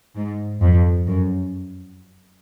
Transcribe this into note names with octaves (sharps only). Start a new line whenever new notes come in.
G#2
F2
F#2